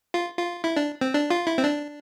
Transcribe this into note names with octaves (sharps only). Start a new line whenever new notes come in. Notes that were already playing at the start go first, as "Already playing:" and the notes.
F4
F4
E4
D4
C4
D4
F4
E4
C4
D4